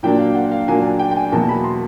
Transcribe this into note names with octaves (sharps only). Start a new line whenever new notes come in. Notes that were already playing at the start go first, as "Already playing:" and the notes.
A#2 F#3 A#3 D4 G5
F5
F#5
F5
A#2 F#3 A#3 D4 G#5
G#5
G5
G5
G#5
E2 B2 F#3 A#3 A5
B5
C6